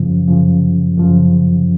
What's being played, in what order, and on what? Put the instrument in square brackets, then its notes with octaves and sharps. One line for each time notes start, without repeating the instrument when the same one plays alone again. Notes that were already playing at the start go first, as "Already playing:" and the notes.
Already playing: [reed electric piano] F#2 C#3 F3
F#2 C#3 F3
F#2 C#3 F3